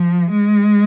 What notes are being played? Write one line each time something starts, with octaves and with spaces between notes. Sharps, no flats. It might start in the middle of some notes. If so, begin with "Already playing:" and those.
Already playing: F3
G#3